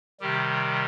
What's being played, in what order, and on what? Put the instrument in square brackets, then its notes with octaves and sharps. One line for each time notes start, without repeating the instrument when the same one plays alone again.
[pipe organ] C3 D#3 G3 G4